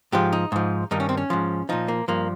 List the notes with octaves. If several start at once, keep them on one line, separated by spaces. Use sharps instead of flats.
G#2 F3 G4
D#4
G#2 F3
G2 D#3 D#4
C#4
C4
C#4
G#2 F3
A#2 F3 D#4
A#3
G2 F3 A#3